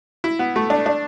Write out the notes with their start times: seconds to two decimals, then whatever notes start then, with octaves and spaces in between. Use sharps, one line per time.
0.24 E4
0.39 B3
0.56 A3
0.70 D4
0.86 D4